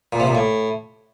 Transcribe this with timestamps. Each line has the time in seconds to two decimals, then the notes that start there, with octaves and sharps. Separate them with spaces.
0.13 A#2
0.20 C3
0.27 A#2
0.35 A2